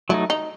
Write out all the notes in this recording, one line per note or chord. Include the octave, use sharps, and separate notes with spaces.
F#3 A3 D#4 E4
D#4